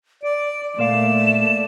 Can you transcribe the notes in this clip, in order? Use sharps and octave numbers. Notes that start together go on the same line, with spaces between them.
D5 D7
A#2 A3 A#4 D5 F5 E7